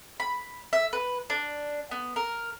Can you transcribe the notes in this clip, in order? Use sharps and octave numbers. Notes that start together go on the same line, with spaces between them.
B5
E5
B4
D4
B3
A#4